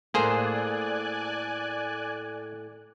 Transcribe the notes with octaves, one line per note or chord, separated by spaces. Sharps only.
A2 A#3 G#4 A4 C5 D5 G#5 F#6